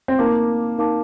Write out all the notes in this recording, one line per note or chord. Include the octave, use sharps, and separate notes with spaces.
C4
A#3 D#4 A#4 F5 A5 D6
D#4 A#4 F5 A5 D6